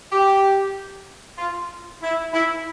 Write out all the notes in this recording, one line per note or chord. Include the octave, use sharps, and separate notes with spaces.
G4
F4
E4
E4